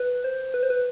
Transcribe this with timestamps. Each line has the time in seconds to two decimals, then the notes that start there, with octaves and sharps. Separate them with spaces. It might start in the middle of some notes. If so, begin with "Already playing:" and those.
Already playing: B4
0.24 C5
0.54 B4
0.63 C5
0.70 B4